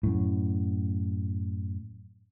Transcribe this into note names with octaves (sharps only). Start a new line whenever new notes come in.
F#2 A2